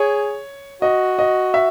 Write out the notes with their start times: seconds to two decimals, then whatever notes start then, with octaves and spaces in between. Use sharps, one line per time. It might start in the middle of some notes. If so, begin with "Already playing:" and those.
Already playing: G#4 C#5
0.82 F#4 D#5
1.19 D#5
1.54 E5